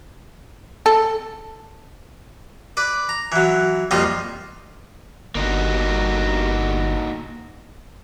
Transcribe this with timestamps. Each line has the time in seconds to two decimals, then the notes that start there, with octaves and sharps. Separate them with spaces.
0.86 A4
2.77 B4 D5
3.09 A#5
3.32 E3 F#3
3.91 A#1 F2 G3 C4 F4 D#5
5.35 G1 A#3 D#4 F#4